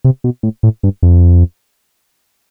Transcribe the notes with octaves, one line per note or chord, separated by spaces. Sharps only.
C3
B2
A2
A2
G2
F2